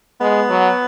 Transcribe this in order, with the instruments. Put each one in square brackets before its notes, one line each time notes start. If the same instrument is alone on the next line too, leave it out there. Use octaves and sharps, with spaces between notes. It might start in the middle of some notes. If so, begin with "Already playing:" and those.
[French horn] G#3 [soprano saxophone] B3
[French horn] F#3